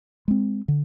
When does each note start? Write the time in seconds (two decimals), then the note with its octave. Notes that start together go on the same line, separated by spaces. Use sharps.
0.28 G#3 C4
0.68 D3